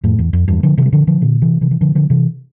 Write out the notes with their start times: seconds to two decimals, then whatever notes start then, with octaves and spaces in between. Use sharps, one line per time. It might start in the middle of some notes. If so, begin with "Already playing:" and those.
0.04 F2 A2
0.19 E2
0.33 F2
0.48 E2 G2
0.63 D3 F3
0.78 C3 E3
0.86 G3
0.92 D3 F3
1.07 D3 F3
1.22 A#2 D3
1.42 C3 E3
1.61 C3 E3
1.71 E3
1.81 D3 F3
1.95 D3 F3
2.10 C3 E3